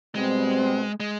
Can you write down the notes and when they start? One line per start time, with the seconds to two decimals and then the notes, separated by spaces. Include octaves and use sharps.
0.15 B2 G3 G#3 C4
1.00 G#3